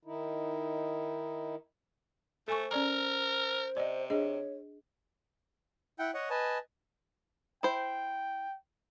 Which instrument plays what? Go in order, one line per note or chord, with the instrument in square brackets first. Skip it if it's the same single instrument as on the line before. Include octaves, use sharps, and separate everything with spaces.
[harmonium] D#3 D#4 E4
[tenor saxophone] A3 [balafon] A4 G#5 C#6 [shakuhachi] C5
[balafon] C#4 D5 A#5 [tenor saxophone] A#4
[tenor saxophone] C3 [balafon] D5 D#5
[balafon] D4 G#4 D#5 [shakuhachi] C#5
[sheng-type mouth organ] E4 F#5 G5
C#5 D#5 F#5
B4 D#5 G#5 A5
[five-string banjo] E4 C5 [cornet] G5